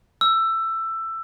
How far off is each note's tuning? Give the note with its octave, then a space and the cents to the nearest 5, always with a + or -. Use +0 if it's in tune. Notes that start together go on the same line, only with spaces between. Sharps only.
E6 +15